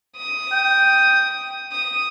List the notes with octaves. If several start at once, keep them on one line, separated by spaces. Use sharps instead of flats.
D#6
G5
D#6